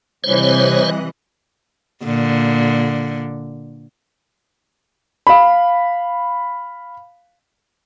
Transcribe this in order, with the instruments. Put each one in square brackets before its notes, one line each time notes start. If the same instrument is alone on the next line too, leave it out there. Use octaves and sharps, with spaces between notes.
[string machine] C3 D#5 F#6 [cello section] E3 G3 [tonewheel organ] C5 C#5
[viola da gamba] A#2 D3
[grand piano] F5 B5